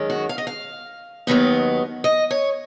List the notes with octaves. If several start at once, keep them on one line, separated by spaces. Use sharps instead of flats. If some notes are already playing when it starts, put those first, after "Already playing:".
Already playing: F#2 D#3 G#3 C#4
F#4
F5
D#5
F5
D#2 D#3 F#3 B3 D#4
D#5
C#5